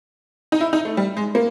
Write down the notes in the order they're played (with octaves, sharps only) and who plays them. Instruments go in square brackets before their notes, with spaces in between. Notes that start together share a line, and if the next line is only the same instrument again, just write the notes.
[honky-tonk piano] D#4
E4
D#4
A3
G3
G#3
A#3